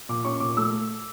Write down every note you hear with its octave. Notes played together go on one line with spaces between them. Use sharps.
A#2 D6
C#4 C#6
A#2 D6
A3 E6